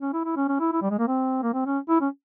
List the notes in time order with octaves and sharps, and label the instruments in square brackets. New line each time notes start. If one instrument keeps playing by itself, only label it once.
[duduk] C#4
E4
E4
C#4
C#4
E4
E4
G3
G#3
A#3
C4
A#3
C4
C#4
E4
C#4